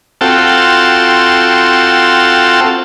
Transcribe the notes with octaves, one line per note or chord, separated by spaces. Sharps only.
C4 F4 F#4 A4 G5 A5